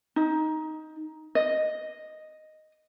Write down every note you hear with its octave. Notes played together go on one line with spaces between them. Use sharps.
D#4
D#5